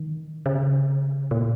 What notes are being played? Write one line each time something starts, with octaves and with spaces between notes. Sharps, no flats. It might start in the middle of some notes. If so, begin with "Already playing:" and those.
Already playing: D#3
C#3
A#2